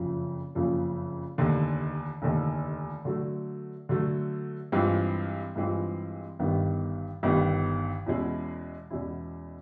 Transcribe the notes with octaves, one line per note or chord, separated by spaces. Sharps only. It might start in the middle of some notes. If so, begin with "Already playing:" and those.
Already playing: F#1 F2 C#3 F3
F#1 F2 C#3 F3
F1 D#2 D3
F1 D#2 D3
D3 F#3 A3
D3 F#3 A3
G2 E3 G#3 C4 F4
G2 E3 G#3 C4 F4
G1 G2 D#3 G3 B3
G1 G2 D#3 G3 B3
E2 B2 G#3 C#4 E4
E2 B2 G#3 C#4 E4